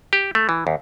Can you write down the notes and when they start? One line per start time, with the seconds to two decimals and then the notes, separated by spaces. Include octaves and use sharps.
0.13 G4
0.35 A3
0.49 E3
0.67 D#2